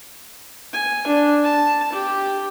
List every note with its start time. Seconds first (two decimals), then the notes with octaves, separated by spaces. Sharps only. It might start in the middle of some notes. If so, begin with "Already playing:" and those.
0.73 G#5
1.07 D4
1.43 A5
1.92 G4